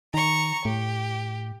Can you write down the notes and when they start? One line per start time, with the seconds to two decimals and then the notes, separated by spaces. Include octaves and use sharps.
0.14 D#3 A#5 C#6
0.65 A2 G4